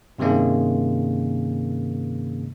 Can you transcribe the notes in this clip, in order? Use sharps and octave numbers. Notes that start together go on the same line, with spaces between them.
G2 C3 D#3 G#3 A#3 C#4